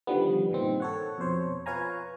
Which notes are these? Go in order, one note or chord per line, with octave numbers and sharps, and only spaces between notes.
D3 D#3 F3 G3 B3
G2 A#2 D#3 C4
A4 C#5 F#5
F2 B2 C5 C#5
F4 B4 C#5 F5 G#5 A#5